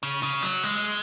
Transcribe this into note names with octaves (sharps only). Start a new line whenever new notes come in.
C#3
C#3
F#3
G#3